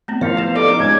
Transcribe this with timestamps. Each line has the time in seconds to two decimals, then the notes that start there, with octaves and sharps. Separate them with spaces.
0.08 A3 B3 C4
0.21 F3 C#4 E4 A#4 F5
0.37 B3 G4 B4
0.55 B3 A4 D5 D#5 D6
0.68 D#4 G4 A#5
0.80 G#3 C#4 G#6